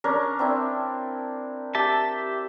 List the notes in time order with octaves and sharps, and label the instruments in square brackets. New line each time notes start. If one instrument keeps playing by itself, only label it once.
[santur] C#4 D4 A#4
C4 D4 E4
[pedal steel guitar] G4 E5 A5